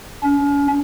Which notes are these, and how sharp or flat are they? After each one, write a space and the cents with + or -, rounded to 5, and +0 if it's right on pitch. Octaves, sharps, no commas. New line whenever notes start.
C#4 +40